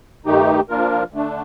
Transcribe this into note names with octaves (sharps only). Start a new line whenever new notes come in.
G2 D#3 A3 D#4 G4
F3 A#3 D4 F4 A#4
D3 A3 D4